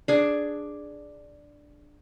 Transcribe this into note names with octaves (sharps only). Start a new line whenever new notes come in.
D4 G#4